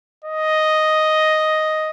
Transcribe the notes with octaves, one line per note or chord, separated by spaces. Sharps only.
D#5